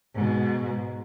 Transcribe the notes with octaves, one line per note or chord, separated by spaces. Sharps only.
G#2 B2